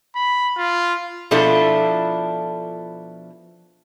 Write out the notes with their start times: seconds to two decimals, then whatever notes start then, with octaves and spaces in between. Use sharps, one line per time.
0.16 B5
0.58 F4
1.31 B2 F3 D4 E4 F4 A4